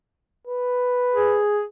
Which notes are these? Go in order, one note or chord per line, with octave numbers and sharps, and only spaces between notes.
B4
G#4